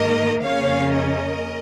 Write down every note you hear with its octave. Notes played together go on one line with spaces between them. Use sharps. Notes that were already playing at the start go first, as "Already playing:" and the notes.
Already playing: G#2 D#3 A#3 A#4 D#5
F2 C#3 A#3 C#4 C#5 F5
A#4 D#5